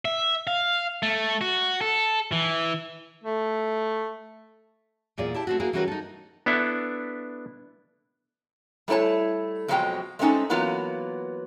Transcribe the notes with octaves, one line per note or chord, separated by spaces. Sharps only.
E5
F5
A3
F#4
A4
E3
A3
E2 A#2 G#4 D5 F5
E4 G4 A5
A3 C4 F#4
A#3 E4 F#4 G#4
E3 G3 C#4 F#4 A#4 B4
D#4 A4
B3 D4 E4 A4 E5
G3 A3 E4 C#5 A5
F2 B2 F3 F#3 G#3 G5
G#3 A3 C4 C#4 D#4 A4
E3 F#3 A#3 B3 F4